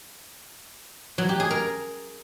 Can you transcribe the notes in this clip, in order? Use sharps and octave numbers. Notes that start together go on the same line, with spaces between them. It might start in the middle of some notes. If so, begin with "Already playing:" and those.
F#3
G4
G#4
A#4